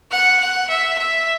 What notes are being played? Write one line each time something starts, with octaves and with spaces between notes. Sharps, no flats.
F#5
F#5
E5
E5